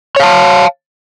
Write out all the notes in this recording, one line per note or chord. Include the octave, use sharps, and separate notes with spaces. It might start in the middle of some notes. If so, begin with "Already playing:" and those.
C#5 F5 A5